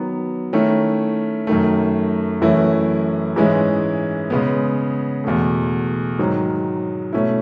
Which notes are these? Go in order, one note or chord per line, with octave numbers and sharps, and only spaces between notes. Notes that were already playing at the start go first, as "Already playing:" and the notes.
Already playing: D#3 F#3 B3
D#3 A3 C#4 E4
F#2 D#3 A3
F#2 E3 A3 C#4 E4
G#2 E3 G#3 C#4 E4
C#3 G#3 B3
E2 B2 A3
G#2 D#3 F#3
B2 A3 C#4 E4